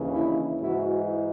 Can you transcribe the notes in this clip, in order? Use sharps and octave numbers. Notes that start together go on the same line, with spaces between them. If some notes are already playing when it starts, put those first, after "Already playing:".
Already playing: D#2 C#3 E3
D4 E4
G#2 E3 E4 F#4